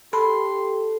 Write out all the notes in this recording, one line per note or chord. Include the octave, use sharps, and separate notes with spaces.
G4 A4 B5 C6